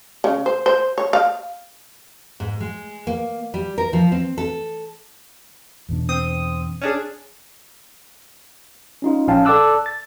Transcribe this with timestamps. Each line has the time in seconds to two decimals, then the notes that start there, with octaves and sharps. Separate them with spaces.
0.24 C#3
0.46 C5
0.66 C5
0.98 C#5
1.13 F5
2.40 G#2
2.60 G#3
3.07 A#3
3.54 G3
3.78 A#4
3.93 F3
4.12 C4
4.38 A4
5.89 E2 B2 D4
6.09 C4 D#6
6.81 C#4 D4 G#4
9.02 C#4 D#4 F4
9.28 A#1 F3 C#4 F5 G5 A5
9.45 A4 D5 A5 D6 E6 F#6
9.86 A6